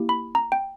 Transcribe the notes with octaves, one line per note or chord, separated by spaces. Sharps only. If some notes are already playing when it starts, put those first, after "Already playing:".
Already playing: A#3 E4 G4
B5
A#5
G5